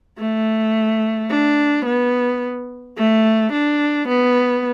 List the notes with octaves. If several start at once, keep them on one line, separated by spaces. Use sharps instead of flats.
A3
D4
B3
A3
D4
B3